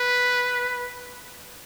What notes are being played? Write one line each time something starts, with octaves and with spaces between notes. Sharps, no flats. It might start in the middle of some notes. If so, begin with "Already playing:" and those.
Already playing: B4